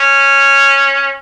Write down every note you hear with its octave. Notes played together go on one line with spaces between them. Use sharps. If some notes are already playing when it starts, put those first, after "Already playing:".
Already playing: C#4